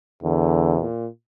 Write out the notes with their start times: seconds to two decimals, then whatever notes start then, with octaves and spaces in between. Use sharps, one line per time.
0.23 E2 D3
0.80 A#2